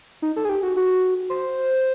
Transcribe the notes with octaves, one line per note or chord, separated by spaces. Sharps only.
D#4
A4
G#4
G4
F#4
F#4
C5